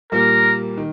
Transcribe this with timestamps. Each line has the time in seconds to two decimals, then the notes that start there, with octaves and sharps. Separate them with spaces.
0.12 A#2 G3 A#3 A#4
0.77 D#3